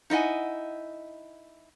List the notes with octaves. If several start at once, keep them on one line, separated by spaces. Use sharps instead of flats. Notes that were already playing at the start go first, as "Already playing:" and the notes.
D#4 E4 D#5 F#5 G#5